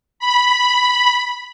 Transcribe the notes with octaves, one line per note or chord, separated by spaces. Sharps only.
B5